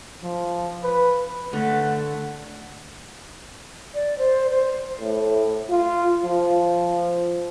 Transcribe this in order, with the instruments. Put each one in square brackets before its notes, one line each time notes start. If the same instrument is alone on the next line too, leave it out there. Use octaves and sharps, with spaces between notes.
[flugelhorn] F3
B4
[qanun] D3 [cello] A3 [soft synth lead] F#5
[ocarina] D5
C5
C5
[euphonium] A2
F4
F3